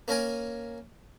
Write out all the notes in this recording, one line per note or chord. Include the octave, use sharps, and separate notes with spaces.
A#3 C#4 A#4 G#5